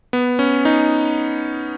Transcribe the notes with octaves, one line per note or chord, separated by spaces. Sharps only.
B3
C#4
D#4